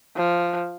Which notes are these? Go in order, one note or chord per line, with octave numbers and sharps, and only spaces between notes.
F3